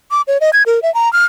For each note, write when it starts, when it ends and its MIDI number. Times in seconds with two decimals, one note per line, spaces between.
0.11 0.22 86
0.28 0.38 73
0.41 0.50 75
0.53 0.63 92
0.66 0.82 70
0.82 0.93 76
0.95 1.11 82
1.13 1.25 89